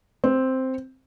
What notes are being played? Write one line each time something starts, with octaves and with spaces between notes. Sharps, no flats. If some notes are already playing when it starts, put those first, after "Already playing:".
C4